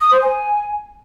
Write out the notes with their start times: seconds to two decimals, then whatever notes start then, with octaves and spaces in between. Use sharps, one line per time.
0.01 D#6
0.11 C5
0.22 G#5